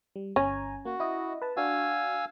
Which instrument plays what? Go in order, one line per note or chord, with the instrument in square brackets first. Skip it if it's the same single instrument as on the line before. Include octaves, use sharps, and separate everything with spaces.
[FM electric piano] G3
[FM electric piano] G1 G#5 A#5 [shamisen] C#4
[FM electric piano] A#3 [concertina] F#4
[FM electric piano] E4 D#5
B4 A5
[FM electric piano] D4 F#4 [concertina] F5 G#5 E6